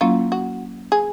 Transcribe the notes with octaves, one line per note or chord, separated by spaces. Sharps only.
F#3 A#3 C#4 E4 F4
F#4
G#4